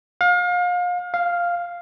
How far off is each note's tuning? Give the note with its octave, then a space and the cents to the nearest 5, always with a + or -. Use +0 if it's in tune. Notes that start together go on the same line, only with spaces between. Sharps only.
F5 +35
F5 +0